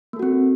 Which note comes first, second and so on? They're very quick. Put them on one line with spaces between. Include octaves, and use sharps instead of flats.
A#3 A4 F#4 C4